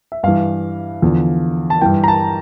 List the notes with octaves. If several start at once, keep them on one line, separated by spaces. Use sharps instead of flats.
E5
G2 E3 F5
E2 D3 F3
A5
G2 E3 G5
A#5
A5